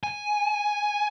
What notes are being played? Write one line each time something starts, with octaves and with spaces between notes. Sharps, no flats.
G#5